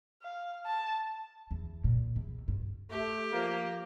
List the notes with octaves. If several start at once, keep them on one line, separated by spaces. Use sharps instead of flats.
F5
A5
E2
A#2
E2
G2
A3 G4
F3 A#3